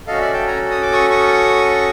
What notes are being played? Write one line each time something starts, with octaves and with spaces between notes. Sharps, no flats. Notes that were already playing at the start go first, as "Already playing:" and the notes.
C#4 F#4 A4 D#5 F5
D5 E5
G5 A5
G#5 A#5
D#6
D6
C#6 D#6
C#6 D#6